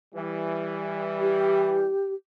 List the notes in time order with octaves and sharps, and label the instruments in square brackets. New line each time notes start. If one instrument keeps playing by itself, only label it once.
[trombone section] E3 G3
[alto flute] G4